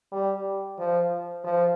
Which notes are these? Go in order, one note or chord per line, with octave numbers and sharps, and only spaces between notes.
G3
F3
F3